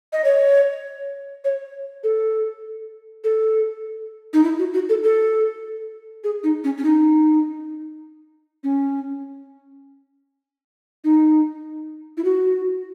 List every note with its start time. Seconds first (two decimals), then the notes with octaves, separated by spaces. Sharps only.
0.13 D#5
0.24 C#5
1.45 C#5
2.04 A4
3.24 A4
4.33 D#4
4.43 E4
4.59 F#4
4.73 F#4
4.89 A4
5.03 A4
6.24 G#4
6.44 D#4
6.64 C#4
6.78 C#4
6.85 D#4
8.64 C#4
11.04 D#4
12.17 E4
12.24 F#4